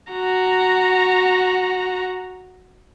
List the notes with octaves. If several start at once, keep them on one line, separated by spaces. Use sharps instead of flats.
F#4 A#5